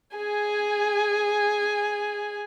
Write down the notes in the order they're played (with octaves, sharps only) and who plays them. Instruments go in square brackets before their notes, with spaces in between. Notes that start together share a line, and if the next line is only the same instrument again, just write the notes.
[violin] G#4 G#5